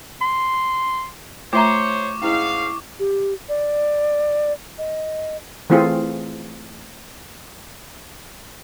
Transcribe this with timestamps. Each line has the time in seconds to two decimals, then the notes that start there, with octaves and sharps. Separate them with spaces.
0.21 C6
1.53 A3 F4 C5 C#5 E5 A#5 C#6 D6
2.22 G#2 C#4 E4 F5
2.99 G4
3.49 D5
4.78 D#5
5.70 E3 A3 C4 F4 G#4